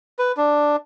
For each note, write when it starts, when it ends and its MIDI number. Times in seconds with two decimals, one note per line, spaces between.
0.19 0.32 71
0.37 0.76 62